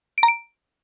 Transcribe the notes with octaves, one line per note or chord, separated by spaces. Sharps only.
D7
A#5
D7